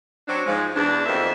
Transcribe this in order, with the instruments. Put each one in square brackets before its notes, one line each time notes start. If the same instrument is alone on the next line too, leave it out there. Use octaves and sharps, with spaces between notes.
[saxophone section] F#3 C4 D4
G#2 F3 G#3
E2 D4
F2 B2 D#3 A#3 C5 E5